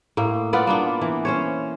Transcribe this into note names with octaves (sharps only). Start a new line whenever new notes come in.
A2 A#3
B3 F4 B4 D5
A#3 B3 D4
E3
C#4 C5 C#5